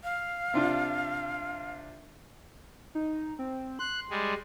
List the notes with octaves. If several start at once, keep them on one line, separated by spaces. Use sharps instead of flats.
F5
C3 D4 F4
D#4
C4
C6 F#6
G3 G#3